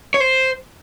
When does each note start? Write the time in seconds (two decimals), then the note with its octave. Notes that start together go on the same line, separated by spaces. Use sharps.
0.14 C#5
0.20 C5